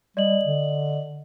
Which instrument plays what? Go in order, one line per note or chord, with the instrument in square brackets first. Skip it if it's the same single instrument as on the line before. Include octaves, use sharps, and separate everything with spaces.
[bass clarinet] G3 [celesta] D5 D#5 F#7
[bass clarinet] D3